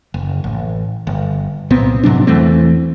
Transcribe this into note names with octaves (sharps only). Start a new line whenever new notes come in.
F#1
A1
G1
C2 A#2 B3 C4
G#2 C3 F#3 D4
E2 E3 A3 C4